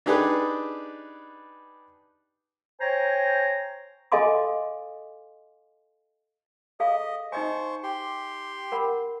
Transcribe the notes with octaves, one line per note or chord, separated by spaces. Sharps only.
D4 D#4 G4 G#4 B4 D5
C5 C#5 G5 G#5 A#5
A4 D#5 F5 G#5 C6 D6
G#4 A4 D#5 F5
D#4 C5 D#5 G#5 C#6
G4 C6
A#4 F#5 B5